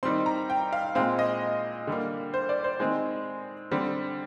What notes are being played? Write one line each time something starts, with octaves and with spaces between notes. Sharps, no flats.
D#3 G3 C4 C6
A#5
G5
F5
A#2 G#3 C4 F5
D#5
D3 G3 A#3
C5
D5
C5
D#3 G#3 C4 G#4
D3 G3 C4